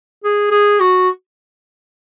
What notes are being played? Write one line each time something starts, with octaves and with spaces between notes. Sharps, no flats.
G#4
G#4
F#4